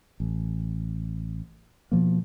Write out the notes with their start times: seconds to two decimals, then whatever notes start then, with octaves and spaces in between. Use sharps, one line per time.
0.20 A1
1.92 B2 F3 A#3